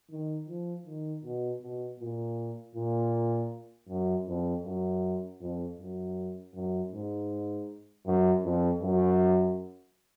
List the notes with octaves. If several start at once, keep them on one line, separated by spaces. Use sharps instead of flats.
D#3
F3
D#3
B2
B2
A#2
A#2
F#2
F2
F#2
F2
F#2
F#2
G#2
F#2
F2
F#2